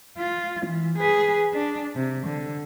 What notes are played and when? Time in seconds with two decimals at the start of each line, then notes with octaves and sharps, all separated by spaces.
0.18 F4
0.66 E3
0.98 G#4 B4
1.53 D4
1.95 C3
2.26 D3